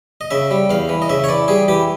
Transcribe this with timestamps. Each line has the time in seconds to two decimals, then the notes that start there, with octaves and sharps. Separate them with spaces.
0.21 D#5
0.31 C#3 E5
0.51 G3
0.70 E2 F5
0.89 E3
1.02 D#5
1.09 C#3 E5
1.24 C#5
1.29 E3 D5
1.48 G3 G#4
1.68 E3 G4